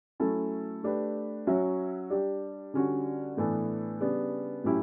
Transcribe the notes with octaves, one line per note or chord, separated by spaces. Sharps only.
F#3 A3 C#4 E4 A4
A3 D4 G4 B4
F#3 C#4 F#4 C#5 E5
G3 D4 G4
D3 G3 C#4 F#4
A2 E3 B3 D4 A4
C#3 G3 B3 D4
A2 F#3 C#4 E4 G4